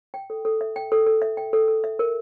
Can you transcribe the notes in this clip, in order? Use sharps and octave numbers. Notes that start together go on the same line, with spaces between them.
G5
A4
A4
E5
G5
A4
A4
E5
G5
A4
A4
E5
A#4